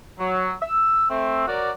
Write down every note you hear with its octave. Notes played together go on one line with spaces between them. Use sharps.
F#3
E6
A3 C4
F#3 F#4 A#4 D5